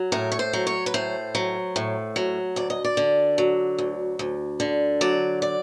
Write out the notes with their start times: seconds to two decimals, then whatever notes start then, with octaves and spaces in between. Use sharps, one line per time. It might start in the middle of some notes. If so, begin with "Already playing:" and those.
Already playing: F#3
0.12 A2 A#4
0.32 C#5
0.39 C5
0.53 F#3
0.67 C#5
0.86 B4
0.94 A2 C5
1.35 F#3
1.76 A2
2.16 F#3
2.56 D2 D5
2.70 D#5
2.84 D5
2.97 D3
3.38 F#3
3.79 D2
4.19 D2
4.60 D3
5.01 F#3 D5
5.42 D5